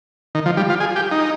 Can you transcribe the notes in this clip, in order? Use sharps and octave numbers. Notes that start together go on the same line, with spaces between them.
D#3
F3
G3
F4
G#4
G4
D#4